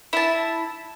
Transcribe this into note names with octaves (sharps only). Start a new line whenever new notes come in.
E4 A5